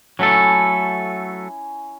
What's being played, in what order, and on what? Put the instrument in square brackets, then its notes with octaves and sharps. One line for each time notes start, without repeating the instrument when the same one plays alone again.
[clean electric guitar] F#3 A3 A4 [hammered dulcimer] C#4 E4